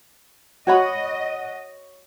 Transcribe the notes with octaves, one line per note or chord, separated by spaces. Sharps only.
F#4 C#5 D#5 F#5 B5